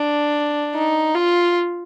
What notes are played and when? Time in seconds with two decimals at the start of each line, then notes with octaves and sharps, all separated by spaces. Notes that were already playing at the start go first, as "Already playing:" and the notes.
Already playing: D4
0.75 D#4
1.15 F4